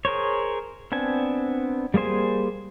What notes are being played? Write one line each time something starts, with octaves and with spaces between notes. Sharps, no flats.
G#4 A#4 C5 C#5
B3 C4 D4 G#5
G3 A#3 G#4 C5 G#5